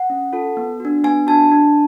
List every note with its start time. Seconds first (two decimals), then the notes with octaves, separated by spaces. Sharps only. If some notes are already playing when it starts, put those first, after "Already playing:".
Already playing: F#5
0.10 C#4
0.33 F4 A4
0.57 B3
0.80 D4 F#4
1.04 B3 G#5
1.27 D4 F#4 A5
1.51 D4